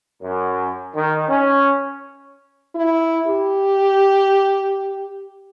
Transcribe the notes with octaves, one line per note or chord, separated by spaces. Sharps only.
F#2
D#3
C#4
E4
G4